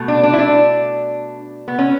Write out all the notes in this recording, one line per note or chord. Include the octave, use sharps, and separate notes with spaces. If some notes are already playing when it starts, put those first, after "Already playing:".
Already playing: B2 A3
D4
D4
E4
D4
B3
C#4